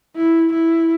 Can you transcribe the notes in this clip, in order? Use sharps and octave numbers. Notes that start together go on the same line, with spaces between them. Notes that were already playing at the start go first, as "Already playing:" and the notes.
E4
E4